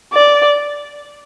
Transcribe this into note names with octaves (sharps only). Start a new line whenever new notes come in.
D5